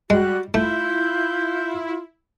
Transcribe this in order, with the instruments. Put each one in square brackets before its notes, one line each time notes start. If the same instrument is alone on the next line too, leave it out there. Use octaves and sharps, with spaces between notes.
[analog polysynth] G3 [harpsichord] G#3 [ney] F#4 [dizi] F#6
[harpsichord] A3 [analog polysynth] E4 [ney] F4 [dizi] G6